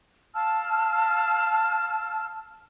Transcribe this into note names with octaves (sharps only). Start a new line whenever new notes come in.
F5 A5 E6 F6